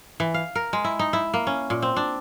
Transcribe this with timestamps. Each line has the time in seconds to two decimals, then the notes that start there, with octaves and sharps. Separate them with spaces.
0.20 E3
0.34 F5
0.55 A#4
0.73 G#3
0.84 E4
0.99 D#4
1.13 E4
1.34 A#3
1.47 C#4
1.70 A#2
1.82 C4
1.97 D4